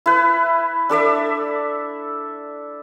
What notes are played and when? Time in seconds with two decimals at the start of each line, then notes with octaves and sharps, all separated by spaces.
0.06 E4 B4
0.89 D4 A4 D5 E5